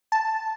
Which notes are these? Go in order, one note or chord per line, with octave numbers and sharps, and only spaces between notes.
A5